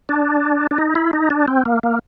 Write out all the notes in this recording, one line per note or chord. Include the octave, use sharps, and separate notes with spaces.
D4
D4
D#4
E4
D#4
D4
C4
A#3
A#3